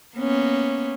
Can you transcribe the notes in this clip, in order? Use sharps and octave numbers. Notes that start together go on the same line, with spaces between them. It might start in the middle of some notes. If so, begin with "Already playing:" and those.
A#3 B3 C#4